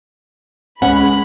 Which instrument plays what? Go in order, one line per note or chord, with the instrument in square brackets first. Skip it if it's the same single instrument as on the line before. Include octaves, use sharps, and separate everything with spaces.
[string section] C#2 G#3 B5 [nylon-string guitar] C#4 [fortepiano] F#5